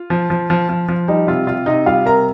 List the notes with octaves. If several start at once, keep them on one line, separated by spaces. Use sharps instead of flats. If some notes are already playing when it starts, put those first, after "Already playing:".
Already playing: F4
F3
F3
F3
F3
F3
G3 D#4
C3 F4
C3 F4
C3 D#4 D#5
G3 F4 F5
C3 A#4 A#5